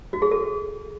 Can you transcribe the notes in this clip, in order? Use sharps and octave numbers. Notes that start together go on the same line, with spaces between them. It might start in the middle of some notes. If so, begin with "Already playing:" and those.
F#4
G#4
A4